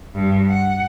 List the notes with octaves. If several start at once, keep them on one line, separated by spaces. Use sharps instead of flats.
G2
F#5